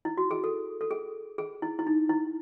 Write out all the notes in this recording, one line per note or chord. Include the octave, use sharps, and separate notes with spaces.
E4
F#4
G#4
A4
A4
G#4
G#4
E4
E4
D#4
E4